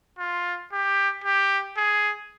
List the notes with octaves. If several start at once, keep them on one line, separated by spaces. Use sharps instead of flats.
F4
G4
G4
G#4